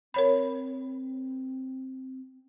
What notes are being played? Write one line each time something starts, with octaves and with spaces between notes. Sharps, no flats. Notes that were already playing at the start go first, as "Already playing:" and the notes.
C4 A#4 C#5 B5